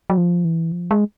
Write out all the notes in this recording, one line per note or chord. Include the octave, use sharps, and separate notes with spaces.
F#3
F3
E3
F3
G#3